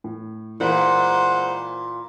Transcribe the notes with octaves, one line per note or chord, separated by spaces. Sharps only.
A2
A#2 E3 G#3 A#4 C5 F#5 B5